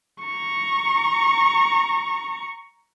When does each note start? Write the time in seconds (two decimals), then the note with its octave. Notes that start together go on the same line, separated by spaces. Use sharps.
0.24 A#5 C#6